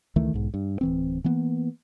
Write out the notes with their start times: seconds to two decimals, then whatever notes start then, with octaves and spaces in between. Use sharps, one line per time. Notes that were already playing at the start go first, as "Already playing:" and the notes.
0.16 C#2 D#3 E3 A3
0.34 B1 G#2
0.54 G2
0.81 D1 E3 C4
1.24 E3 A#3 B3